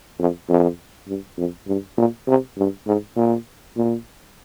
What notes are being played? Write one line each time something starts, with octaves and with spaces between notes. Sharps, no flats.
F2
F2
G2
F2
G2
A#2
C3
G2
G#2
A#2
A#2